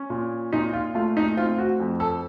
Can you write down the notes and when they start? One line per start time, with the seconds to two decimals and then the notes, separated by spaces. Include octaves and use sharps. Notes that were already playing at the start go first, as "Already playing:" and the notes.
Already playing: C#4
0.10 A#2
0.53 A#2 D#4
0.73 F4
0.95 A3 F4
1.17 D#4
1.37 C4 F4
1.58 F#4
1.80 F2
2.00 A4